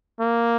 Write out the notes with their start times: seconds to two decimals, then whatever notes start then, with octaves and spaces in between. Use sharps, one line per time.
0.20 A#3